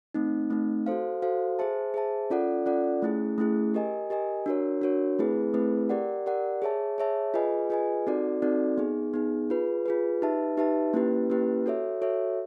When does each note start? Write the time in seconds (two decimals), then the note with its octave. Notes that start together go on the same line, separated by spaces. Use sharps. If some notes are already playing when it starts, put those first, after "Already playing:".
0.14 A3 C4 D#4
0.50 A3 C4 D#4
0.86 F#4 A4 C5 F5
1.22 F#4 A4 C5 F5
1.59 G#4 C5 E5 A5
1.94 G#4 C5 E5 A5
2.30 C#4 F4 A4 D5 F#5
2.66 C#4 F4 A4 D5 F#5
3.02 A3 C#4 E4 G#4
3.38 A3 C#4 E4 G#4
3.74 G4 A#4 D#5 G#5
4.10 G4 A#4 D#5 G#5
4.46 D4 F#4 A#4 C#5
4.82 D4 F#4 A#4 C#5
5.19 A3 C4 E4 G#4 B4
5.54 A3 C4 E4 G#4 B4
5.89 G4 A#4 D5 F#5
6.26 G4 A#4 D5 F#5
6.62 G#4 C#5 E5 A5
6.98 G#4 C#5 E5 A5
7.34 F4 G#4 B4 D#5 G#5
7.70 F4 G#4 B4 D#5 G#5
8.07 C4 D#4 F#4 A4 D5
8.42 C4 D#4 F#4 A4 D5
8.77 B3 D#4 G#4
9.14 B3 D#4 G#4
9.50 F4 G#4 B4
9.86 F4 G#4 B4
10.22 D#4 G4 B4 E5 A5
10.57 D#4 G4 B4 E5 A5
10.93 A#3 C#4 E4 G4 B4
11.30 A#3 C#4 E4 G4 B4
11.66 F#4 A4 C#5 E5
12.02 F#4 A4 C#5 E5